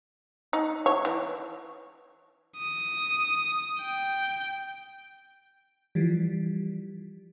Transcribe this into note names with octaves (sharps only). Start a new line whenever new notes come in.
D#4
C#5
E3
D#6
G5
E3 F3 G3